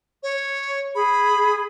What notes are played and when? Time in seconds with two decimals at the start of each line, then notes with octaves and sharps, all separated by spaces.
0.23 C#5
0.95 G#4 B5